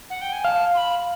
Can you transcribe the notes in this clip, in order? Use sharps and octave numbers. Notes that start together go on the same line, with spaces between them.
F#5
G5
G#5
F5 A5
C6
B5